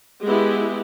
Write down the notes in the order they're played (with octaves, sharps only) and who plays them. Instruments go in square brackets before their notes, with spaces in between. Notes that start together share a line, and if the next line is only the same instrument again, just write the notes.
[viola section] G#3 B3 E4 G4